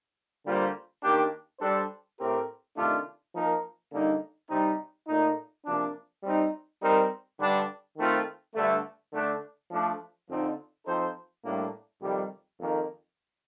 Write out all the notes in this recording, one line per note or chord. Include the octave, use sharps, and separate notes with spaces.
D3 G3 A#3 F4 C5
D#3 A#3 D4 G4
G3 D4 A4 C5
A2 A3 C4 G4 A#4
C3 D#3 A3 D4 F4
F3 A#3 D#4 A#4
D3 G3 A#3 D#4
C3 G3 C4 D#4
A#2 A3 D#4
C3 F3 A#3 D4
G3 C4 D#4
G3 C4 D#4 A#4
G2 D3 G3 D4
D#3 A3 C4 F4
G2 D3 A3
D3 A3 D4
F3 A3 D4
F2 D3 F3 C4 D#4
F3 C4 D#4 A4 C5
A2 G3 A#3 D4
F2 C3 D#3 G3
F2 D#3 A#3